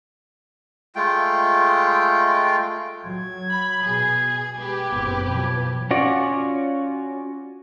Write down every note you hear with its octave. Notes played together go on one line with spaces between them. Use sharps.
G#3 A3 F4 G5
F#3 G#6
B5
B2 G#4
G#3 G4 B4
F#1 B3 C4
B2 F3 F#3
C#4 F4 F#4 C#5 D5